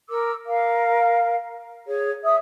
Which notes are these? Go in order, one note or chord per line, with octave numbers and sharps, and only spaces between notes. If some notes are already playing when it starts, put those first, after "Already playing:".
A#4 D6 E6
A#4 F5
G#4 C#5
E5 D#6 E6